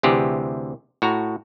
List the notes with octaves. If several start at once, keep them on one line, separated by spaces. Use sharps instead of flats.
D2 C3 E3 G4 G#4
A2 F#4 A#5